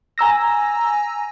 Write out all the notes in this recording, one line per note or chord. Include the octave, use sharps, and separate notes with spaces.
G#5 A#5 E6 A#6